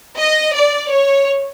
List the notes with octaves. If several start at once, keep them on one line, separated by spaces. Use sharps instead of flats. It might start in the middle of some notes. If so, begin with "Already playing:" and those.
D#5
D5
C#5